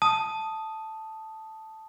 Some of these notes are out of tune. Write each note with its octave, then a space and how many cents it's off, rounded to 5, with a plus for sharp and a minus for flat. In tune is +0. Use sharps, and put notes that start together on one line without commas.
A5 +0 D#6 +0